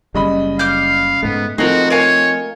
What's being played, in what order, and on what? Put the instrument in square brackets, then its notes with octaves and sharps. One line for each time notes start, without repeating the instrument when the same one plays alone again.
[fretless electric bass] F#1 G3 [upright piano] C#3 D#5 B5
[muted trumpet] F5 [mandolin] D6 F6 G6
[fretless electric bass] G#2 A3 [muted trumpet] B3
[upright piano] F3 C4 D#4 [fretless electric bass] A3 [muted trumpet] F#4 [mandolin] G#4 A#4
[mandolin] A#4 F5 G#5 [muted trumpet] C#5